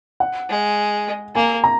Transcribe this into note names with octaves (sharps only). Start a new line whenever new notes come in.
F#5
G#3
A#3 G#5
A#5